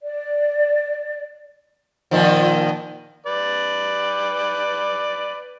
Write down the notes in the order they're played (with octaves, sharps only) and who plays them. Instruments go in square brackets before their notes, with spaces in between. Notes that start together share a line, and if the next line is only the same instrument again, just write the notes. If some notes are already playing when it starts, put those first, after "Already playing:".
[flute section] D5
[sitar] A#2 D#3 F3
[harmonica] B4 D5